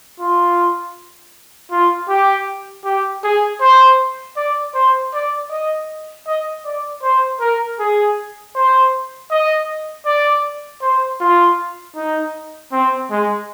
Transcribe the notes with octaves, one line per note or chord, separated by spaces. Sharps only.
F4
F4
G4
G4
G#4
C5
D5
C5
D5
D#5
D#5
D5
C5
A#4
G#4
C5
D#5
D5
C5
F4
D#4
C4
G#3